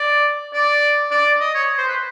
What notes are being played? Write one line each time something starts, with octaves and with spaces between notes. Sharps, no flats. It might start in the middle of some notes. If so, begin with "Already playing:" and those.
Already playing: D5
D5
D5
D#5
C#5
C5
B4